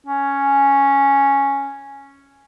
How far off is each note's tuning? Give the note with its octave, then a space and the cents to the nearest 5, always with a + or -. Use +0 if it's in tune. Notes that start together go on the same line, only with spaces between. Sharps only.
C#4 +0